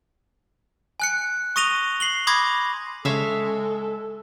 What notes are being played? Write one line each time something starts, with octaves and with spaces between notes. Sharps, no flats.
G#5 F#6 C#7
C#6 D#6 A#6 D#7 F7 G7
C7 F#7 G7
B5 C6 D6 D#6 G#6 A#6
C#3 G#3 A4 C#5 E5 F5